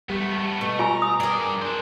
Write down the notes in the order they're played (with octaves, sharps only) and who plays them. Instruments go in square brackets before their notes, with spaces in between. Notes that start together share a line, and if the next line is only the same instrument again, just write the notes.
[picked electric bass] G3 [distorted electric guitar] A3 B3
[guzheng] B2 [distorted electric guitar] A3
[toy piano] F4 G#5 C#6 [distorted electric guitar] A#5
[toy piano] D#6
[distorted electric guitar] G2 D5 [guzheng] G#4 A#4
[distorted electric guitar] D4 C5